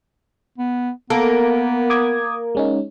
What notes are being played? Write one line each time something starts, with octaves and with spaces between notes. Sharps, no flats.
B3
A#3 B3 A4
D6 D#6 G#6
G#3 C#4 D#4